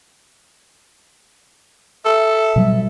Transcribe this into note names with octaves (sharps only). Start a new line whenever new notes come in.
A4 E5
B2 F#3 G3